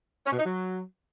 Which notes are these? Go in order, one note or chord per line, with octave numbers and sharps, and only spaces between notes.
C#4
B2
D#4
F#3